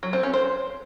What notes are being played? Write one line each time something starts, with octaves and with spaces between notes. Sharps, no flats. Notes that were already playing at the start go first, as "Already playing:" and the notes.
F#3
C4
C#4
C5